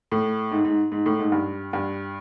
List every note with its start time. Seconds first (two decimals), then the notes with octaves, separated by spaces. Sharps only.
0.12 A2
0.51 G#2
0.65 G#2
0.92 G#2
1.06 A2
1.19 G#2
1.32 G2
1.73 G2